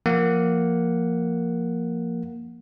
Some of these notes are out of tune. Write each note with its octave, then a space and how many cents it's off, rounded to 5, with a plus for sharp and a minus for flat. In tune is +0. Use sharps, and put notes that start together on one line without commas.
F3 +0 A#3 +0 F#5 +0